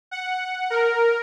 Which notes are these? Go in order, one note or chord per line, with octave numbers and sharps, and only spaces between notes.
F#5
A#4